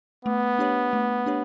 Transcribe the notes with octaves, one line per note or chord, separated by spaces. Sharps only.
A3 B3
D4 G4 C#5
A3
D4 G4 C#5